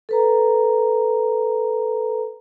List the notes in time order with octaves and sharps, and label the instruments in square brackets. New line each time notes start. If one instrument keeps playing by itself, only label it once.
[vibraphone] A4 B4 A#5